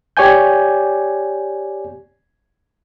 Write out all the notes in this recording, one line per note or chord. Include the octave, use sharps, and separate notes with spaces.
G4 C#5 D5 G5 G#5 G6